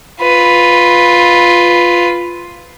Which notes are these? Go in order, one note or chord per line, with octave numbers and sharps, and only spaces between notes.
F4 B4